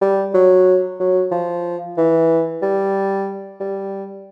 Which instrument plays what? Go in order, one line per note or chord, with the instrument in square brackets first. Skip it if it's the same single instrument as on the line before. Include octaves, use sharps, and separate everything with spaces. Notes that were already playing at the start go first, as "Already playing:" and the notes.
[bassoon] G3
F#3
F#3
F3
E3
G3
G3